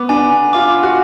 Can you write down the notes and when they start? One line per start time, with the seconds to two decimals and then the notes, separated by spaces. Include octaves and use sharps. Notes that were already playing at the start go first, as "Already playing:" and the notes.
Already playing: B3 D6
0.09 D4 G#5
0.53 F4 D6
0.83 F#4